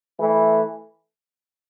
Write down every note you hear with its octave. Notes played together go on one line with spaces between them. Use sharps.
E3 A3 E4